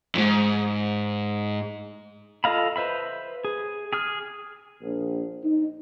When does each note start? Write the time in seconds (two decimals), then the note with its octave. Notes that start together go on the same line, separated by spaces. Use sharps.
0.15 F2 G#2
2.44 F4 A4 D#5 F5 B5
2.76 B4 C5 E5 B5
3.45 G#4
3.93 G#4 D#6 F6
4.82 A#1
5.43 D#4